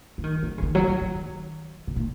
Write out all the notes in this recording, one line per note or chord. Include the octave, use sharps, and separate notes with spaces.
F3
D#3
F#3
C#3
D#3
F#3
F3
D#3
C3
A#2